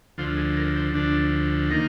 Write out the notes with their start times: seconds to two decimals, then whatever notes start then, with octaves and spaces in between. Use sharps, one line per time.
0.18 D2 D3 F3 F4
0.37 G#4
0.57 A#4
0.75 C5
0.94 D2 D3 F3 D4
1.70 D#3 A#3 D#4